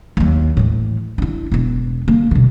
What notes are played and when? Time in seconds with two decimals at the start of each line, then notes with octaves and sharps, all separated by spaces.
0.17 D#2 F#3
0.57 A2 E3
1.18 D4 E4
1.52 E1 B3
2.08 D3 A#3
2.31 B2 D3